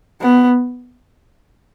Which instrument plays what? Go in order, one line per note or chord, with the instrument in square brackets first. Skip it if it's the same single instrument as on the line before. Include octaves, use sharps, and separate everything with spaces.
[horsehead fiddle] B3